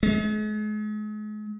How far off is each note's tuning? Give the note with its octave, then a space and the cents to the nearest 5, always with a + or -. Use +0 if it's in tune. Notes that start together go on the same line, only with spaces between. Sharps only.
G#3 +40